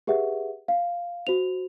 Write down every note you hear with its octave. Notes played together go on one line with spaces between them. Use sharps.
G4 G#4 B4 E5 F#5
F5
F#4 C5 F7